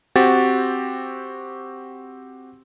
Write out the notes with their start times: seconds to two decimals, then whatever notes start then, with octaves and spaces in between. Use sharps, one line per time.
0.16 C4 F#4 G4 A6